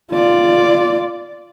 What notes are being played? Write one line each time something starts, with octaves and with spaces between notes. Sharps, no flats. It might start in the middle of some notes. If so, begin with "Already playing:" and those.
F4 D5